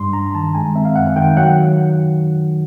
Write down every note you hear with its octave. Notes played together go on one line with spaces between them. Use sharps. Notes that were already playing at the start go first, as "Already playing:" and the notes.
Already playing: G2 G3 C6
G2 A#5
D#3 A5
G#3 G#5
C4 E5
F5
F#2 F#5
D#3 G5
F#3 F#5